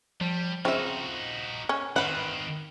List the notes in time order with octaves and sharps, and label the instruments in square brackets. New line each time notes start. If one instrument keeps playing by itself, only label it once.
[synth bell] F3 [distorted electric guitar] G3
[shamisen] C#3 C4 [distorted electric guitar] D#4 F#4 [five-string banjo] F4 E5 [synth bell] C5
[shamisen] C#4
[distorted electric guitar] D#3 C4 [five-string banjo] B4 F5 F#5